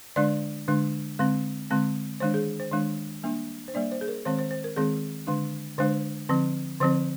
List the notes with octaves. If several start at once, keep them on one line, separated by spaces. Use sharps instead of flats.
D3 G#3 D4 D5
D3 G#3 D4
D3 G#3 C4
D3 G#3 C4
D#3 G#3 D4 C5
G#4
C5
D#3 G#3 D4
G3 A#3 D4
C5
G3 A#3 D4 D5
C5
G#4
A#4
D#3 G#3 C4 C5
C5
C5
A#4
D#3 G#3 C4 G#4
D3 G#3 D4
D3 G#3 D4 C5
D3 F3 C4
D3 F3 C4 C5